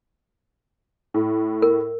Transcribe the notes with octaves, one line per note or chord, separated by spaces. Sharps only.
A2
A#4